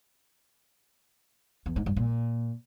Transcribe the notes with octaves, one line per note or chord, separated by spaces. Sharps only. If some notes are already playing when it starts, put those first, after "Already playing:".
E2
G#2
G2
A#2